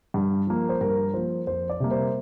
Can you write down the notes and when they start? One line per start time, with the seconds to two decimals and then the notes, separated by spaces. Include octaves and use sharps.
0.14 G2
0.47 F3 A#3
0.69 C5
0.81 G2 A#4
1.14 F3 A#3 C5
1.47 F2 C5
1.70 D5
1.80 C3 G3 A#3
1.91 C5